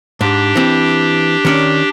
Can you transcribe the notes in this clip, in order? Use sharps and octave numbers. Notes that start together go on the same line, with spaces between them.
G#2 D4 G4
E3 C4
D#3 C#4 D5